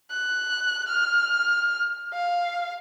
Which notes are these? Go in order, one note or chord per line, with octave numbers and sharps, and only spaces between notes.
F#6
F6
F5